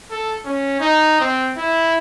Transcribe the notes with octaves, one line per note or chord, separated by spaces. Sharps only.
A4
C#4
D#4
C4
E4